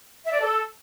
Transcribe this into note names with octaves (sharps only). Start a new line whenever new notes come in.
E5
D5
A4